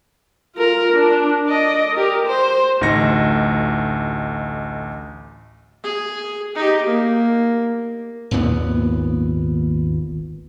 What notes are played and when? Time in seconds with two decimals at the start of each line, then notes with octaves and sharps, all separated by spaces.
0.55 F4 A#4
0.93 D4
1.48 D5 D#5
1.93 G4 A#4
2.26 C5
2.81 A1 D2 D#4 D#5 A#6 C#7
5.83 G#4
6.55 D#4 G4
6.85 A#3
8.31 G#1 D#2 A#2 B3